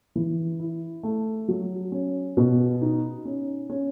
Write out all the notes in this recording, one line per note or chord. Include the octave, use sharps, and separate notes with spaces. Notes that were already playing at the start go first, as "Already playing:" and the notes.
E3
E4
A3
F#3
C#4
B2
D#4
C#4
C#4